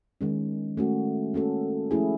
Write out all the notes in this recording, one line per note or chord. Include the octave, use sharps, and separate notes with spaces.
D#3 G#3 C#4
A3 C#4 F#4
A#3 C#4 F#4 A4
F3 A3 C#4 E4 G#4